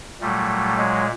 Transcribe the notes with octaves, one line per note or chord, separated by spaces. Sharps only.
A#2 F#3 G3 A3
F#3 G#3